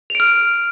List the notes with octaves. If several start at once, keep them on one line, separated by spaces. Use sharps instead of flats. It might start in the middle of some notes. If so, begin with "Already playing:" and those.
F6 D7 F7